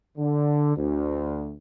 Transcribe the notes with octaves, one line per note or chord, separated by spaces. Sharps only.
D3
D2